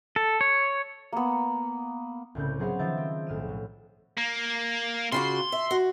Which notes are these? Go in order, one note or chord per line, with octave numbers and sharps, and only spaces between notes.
A4
C#5
A#3 B3
C2 A2 C#3 C4 G6
F#3 B3 G#4 C5 F5
D#3 F3 E5 A6
C4
B1 A2 F6 D#7 E7
A2
A#3
C#3 F4 F#4 C6
E5
F#4